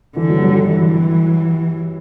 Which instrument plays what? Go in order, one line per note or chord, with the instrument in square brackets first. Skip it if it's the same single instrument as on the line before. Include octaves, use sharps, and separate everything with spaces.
[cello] D3 [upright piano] E3
[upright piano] F#3
G3
F#3
[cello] E3